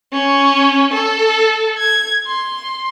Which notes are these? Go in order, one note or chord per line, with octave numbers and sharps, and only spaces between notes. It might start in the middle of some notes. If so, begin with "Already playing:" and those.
C#4
A4
G#6
C6